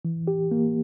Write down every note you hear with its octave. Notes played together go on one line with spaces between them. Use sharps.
E3
G4
A#3